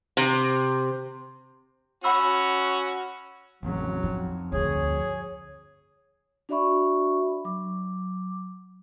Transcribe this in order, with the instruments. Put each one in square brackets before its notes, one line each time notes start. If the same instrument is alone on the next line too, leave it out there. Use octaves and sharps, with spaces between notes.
[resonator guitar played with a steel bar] C3
[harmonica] C#4 F#4 [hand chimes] F#5 B5 E6
[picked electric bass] A1 F2 C#3 [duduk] F#3
[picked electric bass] F2 [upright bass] D#4
[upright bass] D2 G2 [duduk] G#4 [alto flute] C#5
[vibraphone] D4 F#4 D5 E5 B5 C#6
F#3 D6